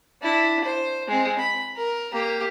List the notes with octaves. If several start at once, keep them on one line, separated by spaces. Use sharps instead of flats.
D4 E4
C5
G#3 C4
B5
A#4
A#3 G4